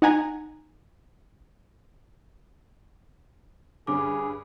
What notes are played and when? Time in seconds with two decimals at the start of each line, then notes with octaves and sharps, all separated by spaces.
0.02 D#4 F#5 G#5 A#5
3.87 G2 D3 C#4 G#4 D6